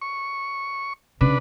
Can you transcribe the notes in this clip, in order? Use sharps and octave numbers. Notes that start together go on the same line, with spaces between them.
C#6
C#3 D4 B4